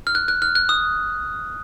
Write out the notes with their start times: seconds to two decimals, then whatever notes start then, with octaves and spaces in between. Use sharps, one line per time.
0.07 F6
0.15 F#6
0.28 F#6
0.42 F6
0.55 F#6
0.69 D#6